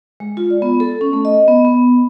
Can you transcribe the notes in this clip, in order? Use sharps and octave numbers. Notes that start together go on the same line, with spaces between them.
G#3
F4
D5
B3
A4
C#4
A3
D#5
B3
B3